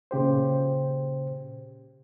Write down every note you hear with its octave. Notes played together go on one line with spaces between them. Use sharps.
A#2 C#3 G4 C5